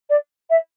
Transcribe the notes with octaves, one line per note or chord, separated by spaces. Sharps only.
D5
E5